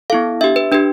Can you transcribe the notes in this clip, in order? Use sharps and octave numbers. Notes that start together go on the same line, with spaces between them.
B3 E4 A4 F5
D4 G4 E5
B4
D4 G4 B4